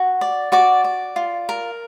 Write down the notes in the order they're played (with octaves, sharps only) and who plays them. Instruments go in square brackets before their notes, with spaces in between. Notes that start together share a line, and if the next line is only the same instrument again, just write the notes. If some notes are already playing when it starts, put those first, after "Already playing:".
Already playing: [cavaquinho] F#4
D5
F#4 D5 D6
D5
F4
A#4